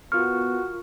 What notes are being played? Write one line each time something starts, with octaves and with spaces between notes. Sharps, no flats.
B3 F4 F#4 A#4 C#6 F6